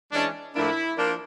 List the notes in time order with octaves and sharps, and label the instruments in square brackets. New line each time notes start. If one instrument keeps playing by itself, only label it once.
[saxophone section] E3 G#3 C#4 [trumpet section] D4
[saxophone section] A2 F3 A#3 D4 [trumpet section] E4
[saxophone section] F3 A#3 D4